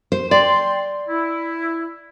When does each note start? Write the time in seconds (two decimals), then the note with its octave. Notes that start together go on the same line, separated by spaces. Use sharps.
0.12 C5
0.31 D5 G5 C6
1.09 E4